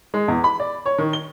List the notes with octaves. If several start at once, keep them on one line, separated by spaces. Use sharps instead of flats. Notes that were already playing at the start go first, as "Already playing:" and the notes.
G#3
E2
B5
D5
C#5
D#3
G7